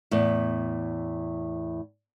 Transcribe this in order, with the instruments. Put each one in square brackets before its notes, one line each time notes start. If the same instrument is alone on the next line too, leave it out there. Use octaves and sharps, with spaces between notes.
[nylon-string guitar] E2 A2